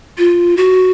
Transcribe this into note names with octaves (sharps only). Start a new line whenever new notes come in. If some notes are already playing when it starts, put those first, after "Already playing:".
F4
F#4